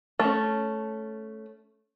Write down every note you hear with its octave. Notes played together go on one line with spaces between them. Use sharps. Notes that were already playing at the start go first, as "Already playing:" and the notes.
A3 C#4